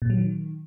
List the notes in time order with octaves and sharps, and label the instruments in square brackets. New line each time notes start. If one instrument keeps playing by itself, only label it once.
[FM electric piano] A#2
F#3
D#3